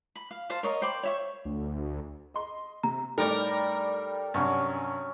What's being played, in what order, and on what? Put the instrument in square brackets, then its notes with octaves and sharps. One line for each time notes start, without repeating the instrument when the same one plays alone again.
[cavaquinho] B5
F5
C5 F5 A5
A#4 C#5 D#5
C5 G5 B5 D6
C#5 E5 C#6
[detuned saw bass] D2
[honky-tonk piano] D#5 C6
[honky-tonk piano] C3 [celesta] A#5
[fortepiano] A2 A3 D#4 [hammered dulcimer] G3 D6 [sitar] A#4 D5
[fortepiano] G2 C3 [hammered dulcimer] F#3 C#4 C#5